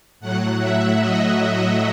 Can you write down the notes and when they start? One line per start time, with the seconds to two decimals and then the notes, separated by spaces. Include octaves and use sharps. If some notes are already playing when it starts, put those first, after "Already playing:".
0.20 A2 F#3 F#5
0.60 E5
1.00 D#5